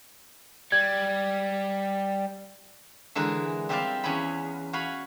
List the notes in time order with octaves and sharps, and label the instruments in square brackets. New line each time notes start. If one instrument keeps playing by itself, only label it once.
[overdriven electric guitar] G3 [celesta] G#6
[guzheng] D3 E3 G#3 A#4
G3 C4 E4 G4 D5 F5
E2 C#4 C#5 G#5 B5
F#4 C#5 F5 G#5 B5